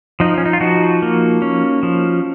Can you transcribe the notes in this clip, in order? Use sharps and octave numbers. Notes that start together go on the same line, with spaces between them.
F3 D#4
C#4
D#4
F4
F3 D#4 F#4
A#3
C#4
F3